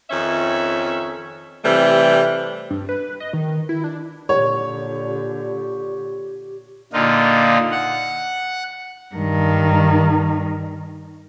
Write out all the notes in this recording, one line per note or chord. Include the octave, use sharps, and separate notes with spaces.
F2 D#3 C#4 E5
C3 E3 G3 A3
G2
B4
D#5
D#3
E4
D4
A#2 D3 G4 C#5
A#2 D3 D#4 F4
F#5
G2 D#3